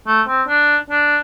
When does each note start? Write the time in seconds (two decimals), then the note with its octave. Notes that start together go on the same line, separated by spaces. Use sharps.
0.07 A3
0.28 C4
0.48 D4
0.90 D4